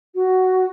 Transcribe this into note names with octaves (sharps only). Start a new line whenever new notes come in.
F#4